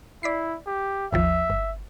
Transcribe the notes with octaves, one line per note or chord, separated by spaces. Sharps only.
E4 D5 B6 C7
G4
G#1 D#2 F3 E5
G1